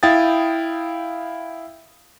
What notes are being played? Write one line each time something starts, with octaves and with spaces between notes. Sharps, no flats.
E4 F5 G5 D#6 A6